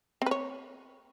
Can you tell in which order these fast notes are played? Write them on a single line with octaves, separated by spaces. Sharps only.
C4 B4 C#5